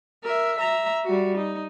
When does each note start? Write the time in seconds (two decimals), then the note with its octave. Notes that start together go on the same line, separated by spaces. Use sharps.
0.24 A#4 E5
0.59 E5 A#5
1.05 G3 F#4
1.38 D#4